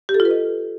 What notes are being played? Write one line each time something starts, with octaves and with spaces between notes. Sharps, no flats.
G4
A4
F4
B4
D#5